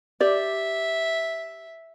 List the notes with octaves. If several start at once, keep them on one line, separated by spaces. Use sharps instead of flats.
G4 D5 E5